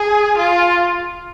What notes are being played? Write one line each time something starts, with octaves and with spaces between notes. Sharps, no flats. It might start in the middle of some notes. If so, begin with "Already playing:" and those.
Already playing: G#4
F4